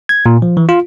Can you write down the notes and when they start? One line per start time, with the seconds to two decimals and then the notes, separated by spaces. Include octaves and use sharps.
0.09 G#6
0.26 A#2
0.42 F3
0.57 E3
0.69 F4